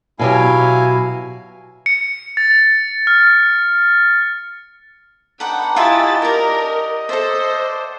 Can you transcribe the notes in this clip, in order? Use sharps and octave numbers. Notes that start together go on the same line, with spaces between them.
B2 F#3 E4 G4 F5 G#5
C#7
A6
F6
D4 D#4 B4 F#5 G5
E4 F4 G4 D#5 E5 G#5 A6
G4 A#4 D5
F#5
A4 C5 D5 E5 F#5 A5